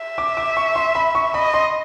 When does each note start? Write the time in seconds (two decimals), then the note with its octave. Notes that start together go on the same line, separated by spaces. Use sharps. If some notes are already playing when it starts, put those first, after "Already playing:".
Already playing: E5
0.18 D6
0.37 D6
0.57 C#6
0.76 C6
0.95 B5
1.15 C#6
1.34 D#5 B5
1.54 C6